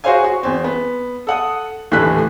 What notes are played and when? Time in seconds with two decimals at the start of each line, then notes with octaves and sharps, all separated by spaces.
0.04 F#4 G#4 C5 C#5 F5 G#5
0.24 F#4
0.43 E2 C4
0.64 B3
1.27 A4 F#5 D#6
1.91 D#1 A2 D3 E3 F#6 B6